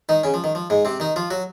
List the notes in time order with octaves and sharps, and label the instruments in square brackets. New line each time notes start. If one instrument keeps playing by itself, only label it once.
[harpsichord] D#3 D#4
C#3 C#4
F3
D#3
F3
G#2 G#3
C3 C4
D#3 D#4
F3 F4
F#3 F#4